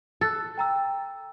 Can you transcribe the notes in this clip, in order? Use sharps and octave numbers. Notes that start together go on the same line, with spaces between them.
A4 F#6 A6
G5 A#5 E6